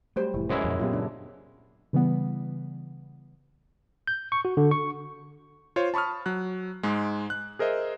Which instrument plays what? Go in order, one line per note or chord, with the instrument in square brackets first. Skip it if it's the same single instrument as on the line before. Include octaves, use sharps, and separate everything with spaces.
[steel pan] F#3 G3 C5 [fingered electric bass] A3
[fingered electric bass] F1 A2 [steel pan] E3
[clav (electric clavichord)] F#2 G#3 E4 [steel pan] C5
[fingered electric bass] F2 A#2
[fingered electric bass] A#2 F#3 B3 [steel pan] F4 G4
[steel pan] C#3 D4
[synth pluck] C#3 E3 G3 B3
[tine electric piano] G6
C#6
F#4
D3
C#6
[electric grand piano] F4 C5 C#5
A5 B5 C#6 D#6 F6
F#3 F#6
G#2 G#3
F#6
G#4 A#4 C5 D#5 E5